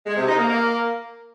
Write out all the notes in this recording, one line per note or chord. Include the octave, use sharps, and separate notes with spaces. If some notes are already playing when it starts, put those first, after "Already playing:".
G#3
C3
D#4
A#3
A#3